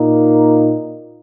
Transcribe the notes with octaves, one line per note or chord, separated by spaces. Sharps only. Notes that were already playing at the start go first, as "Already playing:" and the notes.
Already playing: A#2 A#3 D#4